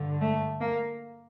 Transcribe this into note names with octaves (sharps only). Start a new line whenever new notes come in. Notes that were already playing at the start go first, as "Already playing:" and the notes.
Already playing: G2 D3
A3
A#3